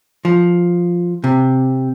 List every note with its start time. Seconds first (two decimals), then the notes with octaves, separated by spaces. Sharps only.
0.25 F3
1.24 C3